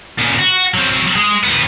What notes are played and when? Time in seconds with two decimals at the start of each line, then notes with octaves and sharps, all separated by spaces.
0.19 A#2 C#3
0.39 F#4
0.74 F#3 C4
1.16 G#3
1.44 D#2 B3